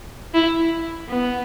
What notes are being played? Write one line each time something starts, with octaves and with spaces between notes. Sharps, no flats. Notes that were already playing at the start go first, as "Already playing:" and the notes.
E4
B3